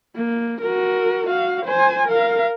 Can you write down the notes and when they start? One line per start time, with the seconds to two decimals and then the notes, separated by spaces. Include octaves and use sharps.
0.15 A#3
0.61 F#4 A#4
1.27 F#4 F5
1.66 C5 G#5
2.08 A#4 F5